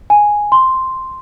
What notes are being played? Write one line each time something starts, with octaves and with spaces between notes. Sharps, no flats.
G#5
C6